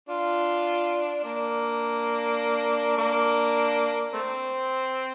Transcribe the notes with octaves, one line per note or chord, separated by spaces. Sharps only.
D4 F4
A#3 D4
A#3 D4
A3 C4